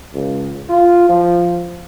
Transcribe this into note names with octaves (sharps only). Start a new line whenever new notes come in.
C#2
F4
F3